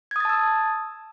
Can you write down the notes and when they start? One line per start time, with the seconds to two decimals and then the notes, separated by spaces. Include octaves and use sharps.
0.11 G#6
0.16 D#6
0.20 A6
0.25 A5
0.30 E6